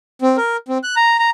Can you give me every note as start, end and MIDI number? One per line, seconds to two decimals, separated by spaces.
0.22 0.37 60
0.37 0.57 70
0.68 0.78 60
0.84 0.95 90
0.96 1.17 82
1.19 1.30 82